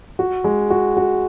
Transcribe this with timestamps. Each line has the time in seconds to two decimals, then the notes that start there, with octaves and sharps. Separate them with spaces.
0.19 F#4
0.44 G#3
0.70 F#4
0.97 F#4